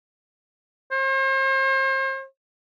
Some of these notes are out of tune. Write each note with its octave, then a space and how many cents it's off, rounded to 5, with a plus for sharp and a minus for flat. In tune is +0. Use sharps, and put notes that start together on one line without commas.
C5 +40